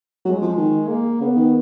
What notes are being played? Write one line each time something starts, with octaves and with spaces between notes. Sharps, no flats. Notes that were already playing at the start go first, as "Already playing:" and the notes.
F#3 G#3
F3
D#3
A#3
C#3 B3
D#3